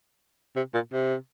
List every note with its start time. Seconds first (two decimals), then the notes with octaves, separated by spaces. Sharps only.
0.56 C3
0.74 A#2
0.93 C3